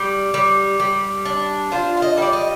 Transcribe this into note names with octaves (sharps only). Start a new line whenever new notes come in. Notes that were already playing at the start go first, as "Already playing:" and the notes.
Already playing: G3
G3
G3
D4
F4 C5
F5
D#5
G3 D5
D#5